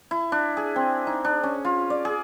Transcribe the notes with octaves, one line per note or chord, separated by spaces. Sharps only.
E4
D4
G#4
C4
D#4
D4
C#4
F4
D5
G#4